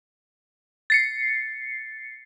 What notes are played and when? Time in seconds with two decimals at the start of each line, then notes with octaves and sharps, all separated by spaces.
0.90 A6 C7 C#7